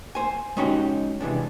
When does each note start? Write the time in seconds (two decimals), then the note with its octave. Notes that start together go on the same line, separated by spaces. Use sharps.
0.15 C5 G#5
0.57 G#3 C#4 D#4 F#4 G4
1.21 C3 E3 G#3 D4